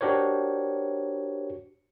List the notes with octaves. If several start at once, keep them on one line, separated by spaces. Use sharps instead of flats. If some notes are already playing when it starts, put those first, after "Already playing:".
D4 F#4 G4 A#4 C5 C#5